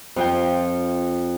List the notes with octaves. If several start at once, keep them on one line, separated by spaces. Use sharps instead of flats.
F2 F4 G5